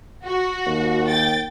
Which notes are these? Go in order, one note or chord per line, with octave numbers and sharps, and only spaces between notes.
F#4
D#2
G5 A6